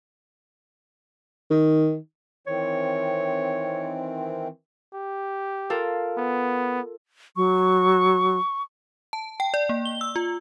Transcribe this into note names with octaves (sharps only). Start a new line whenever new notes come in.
D#3
D#3 E3 C4 C#5
G4
F4 A4 A#4
B3
F#3 C#6
A5
G5
D5
A#3
G7
E6
F4